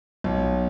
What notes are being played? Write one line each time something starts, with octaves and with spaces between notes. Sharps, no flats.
B1